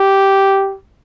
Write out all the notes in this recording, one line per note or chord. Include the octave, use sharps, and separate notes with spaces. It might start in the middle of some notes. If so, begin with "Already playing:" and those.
Already playing: G4